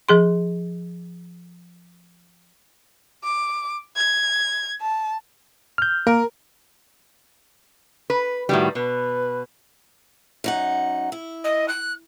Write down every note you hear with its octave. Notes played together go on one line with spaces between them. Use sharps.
F3 G#4 C6
D6
G#6
A5
F6 G6
A#3 A#4
B4
A2 D#3 G3 F#4
B2 B4
F#2 D#4 F#5
E4
D#5
F#6